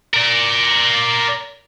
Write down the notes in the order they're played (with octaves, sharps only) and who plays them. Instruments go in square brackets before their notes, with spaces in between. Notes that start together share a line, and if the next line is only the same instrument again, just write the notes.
[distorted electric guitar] A#4 D5